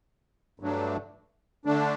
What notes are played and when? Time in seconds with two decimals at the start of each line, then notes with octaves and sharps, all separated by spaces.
0.60 G2 F#3 A3 D4
1.65 D3 A3 D4